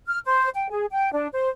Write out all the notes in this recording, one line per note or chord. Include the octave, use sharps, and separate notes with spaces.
F6
C5
G5
G#4
G5
D4
C5